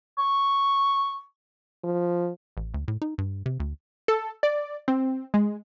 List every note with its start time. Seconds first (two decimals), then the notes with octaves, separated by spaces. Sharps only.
0.19 C#6
1.84 F3
2.57 A1
2.74 D2
2.88 A2
3.02 D#4
3.18 G2
3.46 C3
3.60 D2
4.08 A4
4.43 D5
4.88 C4
5.34 G#3